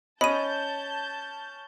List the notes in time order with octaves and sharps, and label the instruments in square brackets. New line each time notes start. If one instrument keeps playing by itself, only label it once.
[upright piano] C#4 [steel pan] D#5 [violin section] A5 G6 [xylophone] B5 D#7